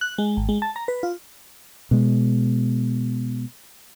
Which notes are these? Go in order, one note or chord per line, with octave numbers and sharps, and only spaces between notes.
F#6
G#3
G#1
G#3
A5
A#5
B4
F4
B2 G#3